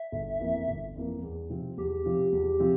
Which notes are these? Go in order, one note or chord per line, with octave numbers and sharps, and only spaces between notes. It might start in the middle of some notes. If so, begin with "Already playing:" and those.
Already playing: E5
G1
F2 E3 A#3
G1
F2 E3 A#3
E2
C3 F3 C4
E2 G4
C3 F3 C4
E2
C3 F3 C4